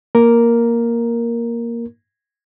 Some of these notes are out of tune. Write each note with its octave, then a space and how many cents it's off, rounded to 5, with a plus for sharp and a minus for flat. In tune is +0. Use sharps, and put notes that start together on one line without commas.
A#3 +5 A#4 +0